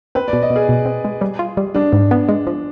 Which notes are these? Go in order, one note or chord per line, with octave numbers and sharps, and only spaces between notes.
C4 B4
D5
B2
D#5
B2
G#4
B2
C4
G#3
G3
F4
G3
G3 D4
G#2
B3
G#3
F3